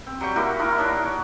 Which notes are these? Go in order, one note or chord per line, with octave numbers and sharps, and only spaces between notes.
C4
F#3 G3 G5 C#6
A#3 E4 F#4 G4
D#4 E4 A#4
D4 D#4 C#5
C#5